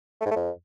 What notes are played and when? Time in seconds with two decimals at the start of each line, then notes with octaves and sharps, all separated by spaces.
0.20 A3
0.26 G#2
0.31 A3
0.36 F2